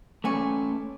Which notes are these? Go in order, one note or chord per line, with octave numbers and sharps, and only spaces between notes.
A3 C#4 D5 G#5 C#6